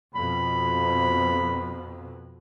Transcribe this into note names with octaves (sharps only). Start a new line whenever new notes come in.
F2 B2 B5